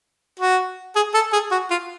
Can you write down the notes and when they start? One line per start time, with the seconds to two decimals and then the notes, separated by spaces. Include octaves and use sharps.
0.40 F#4
0.96 G#4
1.14 A4
1.33 G#4
1.52 F#4
1.71 F4